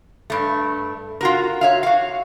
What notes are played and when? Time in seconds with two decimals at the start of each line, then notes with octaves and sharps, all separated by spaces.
0.30 G2 A3
1.21 F4 F#4 A#4
1.61 C#5 E5 F5
1.83 F#4 F5